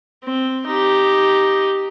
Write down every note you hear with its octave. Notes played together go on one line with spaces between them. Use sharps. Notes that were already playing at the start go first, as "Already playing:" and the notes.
C4
D#4 G4